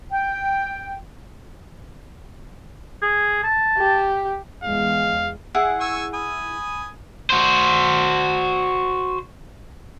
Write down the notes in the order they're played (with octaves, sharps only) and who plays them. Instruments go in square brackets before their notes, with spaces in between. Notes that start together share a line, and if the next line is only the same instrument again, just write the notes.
[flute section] G5
[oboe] G#4
A5
[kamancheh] G4
[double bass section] E2 G#3 [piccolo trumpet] F5
[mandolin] E4 G#4 F#6 [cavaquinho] F#5
[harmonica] G#5 C#6 E6
G#5 B5 D#6
[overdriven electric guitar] F#4 C5